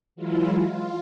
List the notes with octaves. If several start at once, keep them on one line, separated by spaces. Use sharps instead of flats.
E3 F#3 G#3 E4 F4
F4